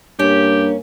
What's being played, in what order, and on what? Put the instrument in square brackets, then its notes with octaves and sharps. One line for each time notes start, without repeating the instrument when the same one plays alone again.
[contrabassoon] G2 [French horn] A#3 [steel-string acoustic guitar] C#4 [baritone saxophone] G4